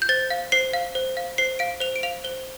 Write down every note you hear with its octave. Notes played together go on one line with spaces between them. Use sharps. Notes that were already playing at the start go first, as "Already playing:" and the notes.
G6
C5 A6
F5
C5 C7
F5
C5
F5
C5 C7
F5 D7
C5 F7
D7
F5 F7
C5 G7